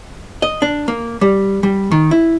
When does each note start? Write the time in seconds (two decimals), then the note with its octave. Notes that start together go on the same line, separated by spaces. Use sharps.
0.42 D#5
0.62 D4
0.88 A#3
1.21 G3
1.63 G3
1.92 D#3
2.11 E4